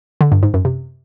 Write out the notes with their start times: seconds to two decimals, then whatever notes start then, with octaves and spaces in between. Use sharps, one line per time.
0.21 D3
0.32 G2
0.43 G#2
0.54 F#2
0.65 C3